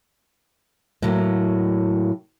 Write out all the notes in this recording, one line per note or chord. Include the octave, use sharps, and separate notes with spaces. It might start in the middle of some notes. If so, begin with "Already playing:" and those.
A2 F#3 A#3